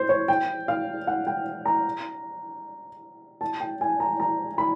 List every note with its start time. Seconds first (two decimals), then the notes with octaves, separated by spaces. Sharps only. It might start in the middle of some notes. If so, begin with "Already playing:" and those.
Already playing: C5
0.09 C#5
0.28 G5
0.68 F5
1.07 F#5
1.27 G5
1.66 A#5
3.41 A5
3.60 G5
3.81 G#5
4.00 A#5
4.20 A#5
4.58 B5